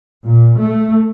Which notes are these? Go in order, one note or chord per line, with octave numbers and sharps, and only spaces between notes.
A#2
A3